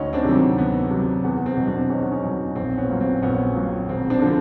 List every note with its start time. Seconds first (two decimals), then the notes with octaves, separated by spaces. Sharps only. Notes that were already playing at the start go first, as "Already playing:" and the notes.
Already playing: D2 C#4 D#4
0.13 C4 D4
0.24 C3 D#3 F#3
0.35 C4
0.58 D2 B3
0.90 C3 D#3 F#3
1.24 E2 B3
1.46 C4
1.57 B2 F#3
1.67 C4 D4
1.90 E2 C#4 D#4
2.12 C#4 D#4
2.23 B2 F#3
2.56 A#1 C4
2.78 B3 C#4
2.89 A#2 F#3
3.01 C4
3.22 A#1 B3 C#4
3.55 A#2 F#3
3.89 E1 C4
4.10 C4 D4
4.22 D3 F3